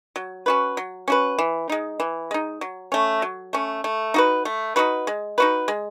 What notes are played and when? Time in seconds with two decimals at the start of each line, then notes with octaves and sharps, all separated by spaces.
0.16 F#3
0.46 C#4 F#4 B4
0.77 F#3
1.08 C#4 F#4 B4
1.39 E3
1.69 G#3 D#4
2.00 E3
2.31 G#3 D#4
2.61 F#3
2.92 A3 C#4
3.22 F#3
3.53 A3 C#4
3.84 A3
4.14 D#4 F#4 B4
4.45 A3
4.76 D#4 F#4 B4
5.07 G#3
5.38 D#4 F#4 B4
5.68 G#3